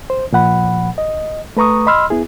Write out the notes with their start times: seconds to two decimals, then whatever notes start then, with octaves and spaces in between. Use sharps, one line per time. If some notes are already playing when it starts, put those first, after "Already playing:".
0.10 C5
0.33 A#2 F3 F#5 B5
0.98 D#5
1.57 A3 B4 A#5 C#6 D#6
1.87 D#5 B5 C6 E6 F6
2.10 B3 E4 G#4